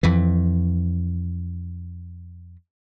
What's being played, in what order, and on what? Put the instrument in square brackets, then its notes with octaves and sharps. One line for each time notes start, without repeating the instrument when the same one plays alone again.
[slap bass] F2 E3